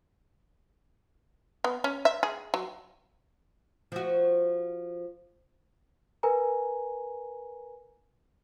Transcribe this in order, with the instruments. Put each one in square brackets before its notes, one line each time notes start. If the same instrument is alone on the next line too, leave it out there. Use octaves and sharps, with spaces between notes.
[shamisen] B3
C#4
E5
G#4
F#3
[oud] F3 F#4
[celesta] A#4 B4 G#5 A#5